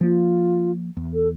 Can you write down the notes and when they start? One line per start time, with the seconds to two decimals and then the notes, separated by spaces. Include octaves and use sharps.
0.01 F3 A#3 F4
0.97 E2
1.14 A4